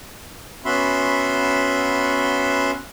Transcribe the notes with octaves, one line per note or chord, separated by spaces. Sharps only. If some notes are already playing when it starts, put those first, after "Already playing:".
B3 C#4 F#4 E5 B5 C6